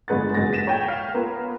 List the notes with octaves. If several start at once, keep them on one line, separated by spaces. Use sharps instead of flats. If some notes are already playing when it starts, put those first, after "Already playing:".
G1 G#3 B4 F#5 A6
F#1 G#3 F#4 A6 A#6
B6 D#7 E7
C#5 G5 G#6
F5
B3 F4 A#4 B4